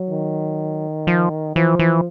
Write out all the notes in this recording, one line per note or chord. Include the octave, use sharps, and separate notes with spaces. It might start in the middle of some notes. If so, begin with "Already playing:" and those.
Already playing: F#3
D#3
F3
E3 F3
E3